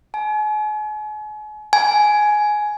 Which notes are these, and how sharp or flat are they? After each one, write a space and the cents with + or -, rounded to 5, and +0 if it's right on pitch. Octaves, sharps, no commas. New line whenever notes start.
G#5 +40
G#5 +10